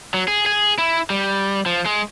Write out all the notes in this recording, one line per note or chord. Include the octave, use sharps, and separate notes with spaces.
F#3
G#4
G#4
E4
G3
F3
G#3